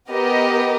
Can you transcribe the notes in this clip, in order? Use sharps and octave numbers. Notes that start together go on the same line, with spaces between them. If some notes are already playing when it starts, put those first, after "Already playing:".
B3 G4 A#4 D#5